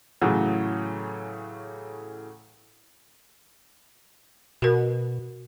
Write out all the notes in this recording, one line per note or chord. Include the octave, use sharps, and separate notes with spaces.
A2 C#3 E3 F#3 A3
B2 F#4 A#4